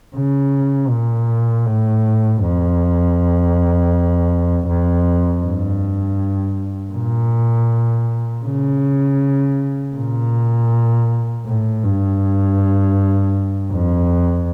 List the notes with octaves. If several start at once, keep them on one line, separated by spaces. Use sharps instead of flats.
C#3
A#2
A2
F2
F2
G2
A#2
C#3
A#2
A2
G2
F2